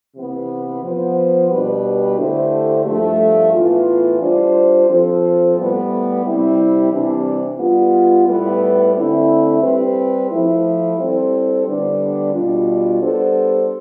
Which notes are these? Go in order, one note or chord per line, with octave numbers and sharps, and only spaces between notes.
C3 E3 B3
F3 B3 F4 C5
B2 G3 D4 G4 B4
D3 A3 E4 G4 C5
G2 F3 A3
A2 E3 B3 F4
G3 D4 F4 C5
F3 C4 F4 A4 C5
A2 G3 B3
C3 G3 C4 E4
C3 E3 G3 D4
G3 B3 F4
A2 G3 B3 E4 B4
D3 A3 C4 E4
G3 C4 G4 B4
F3 A3 E4
G3 C4 E4 A4 C5
D3 G3 B3 D4
B2 G3 D4 F4
G3 B3 D4 A4 C5